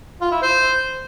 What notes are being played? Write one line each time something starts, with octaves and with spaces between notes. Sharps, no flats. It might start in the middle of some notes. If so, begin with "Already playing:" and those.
F4
E4
C5